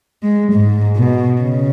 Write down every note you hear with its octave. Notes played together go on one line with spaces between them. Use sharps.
G#3
G#2
B2
C#3